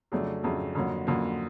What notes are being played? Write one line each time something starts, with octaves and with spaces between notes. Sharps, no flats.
F2 C#3 F#3 A3 D4
F2 C#3 F#3 A3 D4
F2 D3 F#3 A#3
F2 D3 F#3 A#3